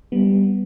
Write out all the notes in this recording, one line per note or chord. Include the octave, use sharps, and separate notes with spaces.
G3 B3